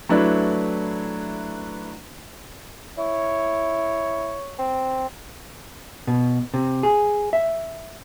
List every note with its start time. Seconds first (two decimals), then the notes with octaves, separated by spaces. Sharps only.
0.09 F#3 A3 D4 E4 B4
2.98 E4 C#5
4.59 C4
6.07 B2
6.54 C3
6.83 G#4
7.33 E5